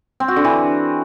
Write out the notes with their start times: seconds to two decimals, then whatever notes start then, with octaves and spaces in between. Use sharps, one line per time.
0.20 C4
0.28 F#4
0.36 D3
0.44 E3